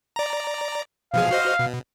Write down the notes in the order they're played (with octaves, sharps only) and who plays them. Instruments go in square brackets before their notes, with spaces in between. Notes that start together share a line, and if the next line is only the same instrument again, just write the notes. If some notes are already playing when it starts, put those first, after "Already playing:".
[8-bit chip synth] D5 A#5
[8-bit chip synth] B2 F3 G#4 [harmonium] F5
[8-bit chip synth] F#4 C5 D#5
B2